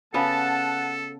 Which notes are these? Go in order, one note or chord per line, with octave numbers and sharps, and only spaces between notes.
C#3 B3 A4 B4 F#5 A5